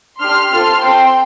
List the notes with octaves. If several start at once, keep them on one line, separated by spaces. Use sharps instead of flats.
D4 G4 C6 F6
C4 F4 A4 C6 F6
C4 A4 G5 C6